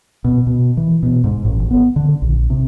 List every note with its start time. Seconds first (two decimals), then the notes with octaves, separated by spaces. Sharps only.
0.24 B2
0.47 B2
0.77 E3
1.03 B2
1.24 G#2
1.45 A1
1.60 G#1
1.71 B3
1.96 D3
2.22 A#1
2.50 C3